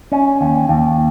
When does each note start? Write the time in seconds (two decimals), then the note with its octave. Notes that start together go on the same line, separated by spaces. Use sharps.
0.12 C#4
0.41 D#2
0.69 D#2